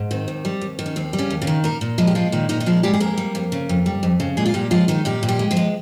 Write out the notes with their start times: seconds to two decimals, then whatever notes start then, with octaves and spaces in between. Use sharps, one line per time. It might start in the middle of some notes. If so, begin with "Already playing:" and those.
Already playing: G#2
0.11 D#3 C4
0.28 D#2
0.45 G3
0.61 D#2
0.79 D#3
0.86 C#4
0.96 D#2 C4
1.13 G3
1.18 C#3 C#4
1.30 D#2
1.42 C#3 C#4
1.47 D#3
1.64 A#2 A#3 A#4
1.81 A#2
1.98 F3 G#3 F4
2.07 G4
2.15 F3 G#3 F4
2.32 A#2 D#3 D#4
2.49 A#2 D#3 D#4
2.60 D#4
2.66 F3 G#3 F4
2.83 G3 G#3 G4
2.93 G#4
3.00 F2 A#3 A#4
3.18 G3
3.35 F2
3.52 C#3
3.69 F2
3.86 G3
4.03 F2
4.20 C#3
4.37 A#2 G#3 G#4
4.46 F4
4.54 A#2 G3 G4
4.71 F3 G#3 F4
4.88 D#3 G#3 D#4
5.05 A#2 G3 G4
5.23 A#2
5.28 G3 G4
5.39 G#3
5.51 F3 F4
5.57 G#3